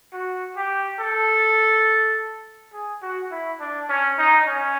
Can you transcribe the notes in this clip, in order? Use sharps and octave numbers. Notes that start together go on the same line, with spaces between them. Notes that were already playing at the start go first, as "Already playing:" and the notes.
F#4
G4
A4
G#4
F#4
E4
D4
C#4
D#4
C#4